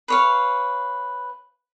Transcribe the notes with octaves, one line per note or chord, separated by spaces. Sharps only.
B4 C#5 F5